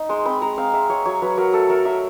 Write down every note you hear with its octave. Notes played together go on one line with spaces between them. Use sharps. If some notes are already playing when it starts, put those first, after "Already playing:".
Already playing: D#4
G#3 C6
C4 B5
G#3 A#5
C4 F5
G#3 E5
G#3 C#5
F#3 C#5
F#3 B4
F#3 A#4
A3 A4
A3 A#4
F#3 E5